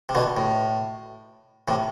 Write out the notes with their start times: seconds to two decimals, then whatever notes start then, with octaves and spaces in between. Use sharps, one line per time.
0.09 C3
0.15 B2 D3
0.37 A2
1.68 A2 C3